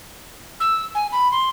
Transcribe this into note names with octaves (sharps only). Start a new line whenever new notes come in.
E6
G#5
B5
C6